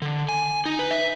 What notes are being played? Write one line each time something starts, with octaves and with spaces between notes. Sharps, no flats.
D3
G#5
D#4
B4
E5